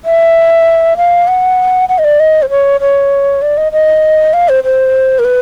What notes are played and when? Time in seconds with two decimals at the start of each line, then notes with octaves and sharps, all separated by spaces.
0.05 E5
0.97 F5
1.28 F#5
1.89 F#5
1.98 D#5
2.04 D5
2.20 D#5
2.42 C5
2.50 C#5
2.81 C#5
3.42 D5
3.57 D#5
3.72 D#5
4.33 F5
4.49 C5
4.64 C5
5.19 A#4
5.24 B4